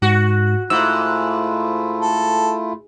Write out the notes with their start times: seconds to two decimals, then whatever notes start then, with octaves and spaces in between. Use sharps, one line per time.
0.02 G#2 F#4
0.70 G#2 A3 E4 F4 E6
2.01 A4